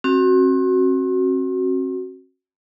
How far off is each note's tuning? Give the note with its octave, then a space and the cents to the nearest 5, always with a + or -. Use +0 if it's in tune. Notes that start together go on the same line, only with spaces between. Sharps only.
C4 +40 F#4 +5